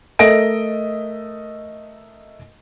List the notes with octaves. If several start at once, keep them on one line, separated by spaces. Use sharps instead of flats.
A3 A#4 D#5 E5 A#6 D7